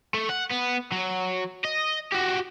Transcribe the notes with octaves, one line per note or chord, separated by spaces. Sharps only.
A3
F#5
B3
F#3
D#5
F#4 G4